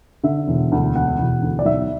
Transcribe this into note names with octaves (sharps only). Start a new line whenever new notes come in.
D3 E5
E1
D2
E1 F#5
E1
D2
D5
B1 E5